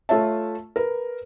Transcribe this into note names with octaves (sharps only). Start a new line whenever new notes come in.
A3 F4 C#5 E5 A5
A#4 B4